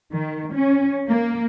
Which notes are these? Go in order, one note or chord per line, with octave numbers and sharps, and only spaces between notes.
D#3
C#4
A#3